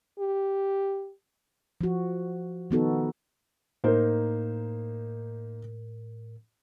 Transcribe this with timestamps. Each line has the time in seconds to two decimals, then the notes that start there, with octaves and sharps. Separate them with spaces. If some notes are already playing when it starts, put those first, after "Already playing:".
0.19 G4
1.81 F3 F#4
2.71 D#3 F3 B3 D#4 F#4 A4
3.84 A2 A#3 D#4 A#4 C5